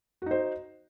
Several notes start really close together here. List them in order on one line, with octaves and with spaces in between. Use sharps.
F#4 D#4 C5